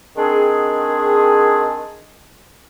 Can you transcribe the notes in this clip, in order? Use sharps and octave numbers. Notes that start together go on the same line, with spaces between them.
D#3 G#3 C4 D4 G#4